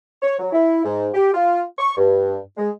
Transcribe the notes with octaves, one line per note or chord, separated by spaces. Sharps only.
C#5
F#3
E4
G#2
G4
F4
C#6
G2
G#3